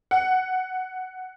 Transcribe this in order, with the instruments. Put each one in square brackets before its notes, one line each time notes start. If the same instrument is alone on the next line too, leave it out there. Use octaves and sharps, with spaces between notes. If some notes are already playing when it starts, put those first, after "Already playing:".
[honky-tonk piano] F#5